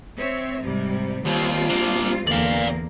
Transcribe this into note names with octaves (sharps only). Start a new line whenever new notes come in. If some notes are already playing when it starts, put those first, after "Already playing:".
C4 C#5 E5
G#2 C3 G3
D#2 G3 C4 F4
A#3 D4
E2 D3 A#3 D5 F5